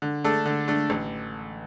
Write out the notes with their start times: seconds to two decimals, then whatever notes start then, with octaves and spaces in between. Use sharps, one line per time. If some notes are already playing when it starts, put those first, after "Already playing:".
0.02 D3
0.24 A3 D4 A4
0.45 D3
0.68 A3 D4 A4
0.90 A1